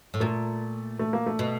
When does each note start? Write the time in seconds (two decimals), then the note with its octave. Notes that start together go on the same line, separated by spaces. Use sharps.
0.14 A2
0.20 A#2 A3
0.99 A3
1.13 A#3
1.26 A3
1.39 B2